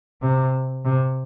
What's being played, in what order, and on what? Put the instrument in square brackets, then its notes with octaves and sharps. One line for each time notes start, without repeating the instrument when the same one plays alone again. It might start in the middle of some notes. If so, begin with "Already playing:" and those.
[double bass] C3
C3